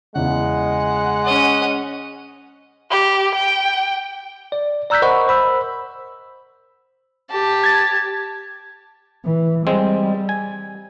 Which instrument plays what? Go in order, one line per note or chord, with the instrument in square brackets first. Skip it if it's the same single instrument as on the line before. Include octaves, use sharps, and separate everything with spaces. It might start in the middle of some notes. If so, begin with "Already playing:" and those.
[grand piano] E2 C#3 [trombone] G#3 [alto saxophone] F#5
[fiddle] C#4 D#5
[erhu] G4
G5
[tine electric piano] D5
D5 A#5 E6 F#6 G6 B6
A#4 C5 D#5 F#5 B5 C#6
C5 B5 E6
[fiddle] G4 A5
[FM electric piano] G#6 A6
[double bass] E3
[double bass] G3 [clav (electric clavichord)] G#3 C4
[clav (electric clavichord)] G#5